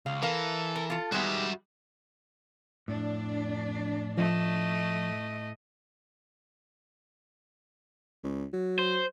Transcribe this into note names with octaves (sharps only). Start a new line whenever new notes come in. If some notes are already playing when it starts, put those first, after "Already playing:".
C#2 F5
E3 A4 A#4 F5
A#4
F4 A4
D#3 G3 G#3 B3 F#4 E5
F2 A2 D4
F3 A3 D#5
C#2
F#3
C5